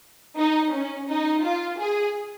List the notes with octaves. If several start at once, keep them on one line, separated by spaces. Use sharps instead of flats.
D#4
C#4
D#4
F4
G#4